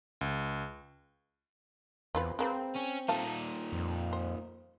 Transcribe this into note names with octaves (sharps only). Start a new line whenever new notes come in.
C#2
E2 C4 F4 B4
G#3 A#3 C4 B4
C#4
A#2 A3 D#4 F5 A5
F2
C5